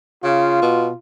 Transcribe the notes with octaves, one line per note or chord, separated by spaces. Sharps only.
C#3 F4
B2